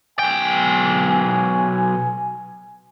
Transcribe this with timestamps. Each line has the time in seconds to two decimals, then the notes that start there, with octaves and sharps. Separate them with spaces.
0.19 B1 G5 G#5